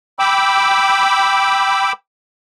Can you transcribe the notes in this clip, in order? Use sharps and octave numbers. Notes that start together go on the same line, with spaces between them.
G5 B5 D6 E6